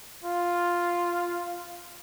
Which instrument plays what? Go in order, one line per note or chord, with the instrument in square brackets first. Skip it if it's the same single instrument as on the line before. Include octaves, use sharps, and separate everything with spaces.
[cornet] F4